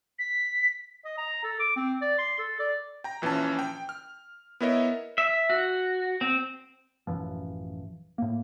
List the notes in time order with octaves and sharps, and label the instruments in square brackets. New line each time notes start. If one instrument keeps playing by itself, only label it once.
[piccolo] B6
[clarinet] D#5
A#5
A4
D6
C4
D5
C6
A4
D5
[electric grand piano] G5 A#5
A#1 E3 F3 C#4 A5
G5
F6
B3 E4 A#4 C#5 D#5 E5
[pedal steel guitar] E5
F#4
C4
[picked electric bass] A1 F#2 E3 F3
A2 A#3